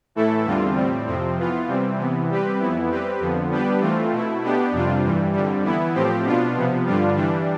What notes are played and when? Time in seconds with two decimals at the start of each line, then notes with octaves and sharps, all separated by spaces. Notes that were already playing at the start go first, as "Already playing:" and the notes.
0.15 A2 E3 A3 E4 A4
0.45 E2 D3 G3 C4 F4
0.77 A2 G3 C4
1.07 F2 C3 F3 C4
1.38 E3 B3 F4
1.67 C3 E3 G3 C4
1.98 C3 E3 B3
2.29 G3 C4 G4 B4
2.59 F2 E3 B3 E4
2.90 G3 C4 G4 B4
3.20 F2 D3 F3 B3
3.50 G3 B3 D4 G4 B4
3.81 E3 A3 C4 F4
4.12 B2 A3 E4
4.42 B2 B3 D4 G4
4.72 F2 C3 G3 D4 F4
5.04 G2 E3 G3
5.33 F2 D3 G3
5.64 E3 B3 E4
5.94 A2 F3 C4 G4
6.25 B2 B3 D4 F4
6.56 C3 F3 B3
6.86 G2 D3 G3 D4 F4
7.16 E3 G3 D4